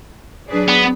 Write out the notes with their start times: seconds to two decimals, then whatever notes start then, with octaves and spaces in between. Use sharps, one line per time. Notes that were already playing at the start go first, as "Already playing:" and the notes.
0.48 F#3 D4 G#4 B4 D5
0.69 B3